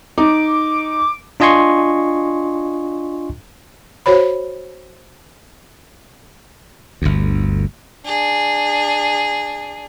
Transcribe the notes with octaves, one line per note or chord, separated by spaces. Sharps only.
D#4 D6
D4 F4 D#5 G#5 C6 C#6
F#4 C5 C#5 B5
G1 D2
D4 G#4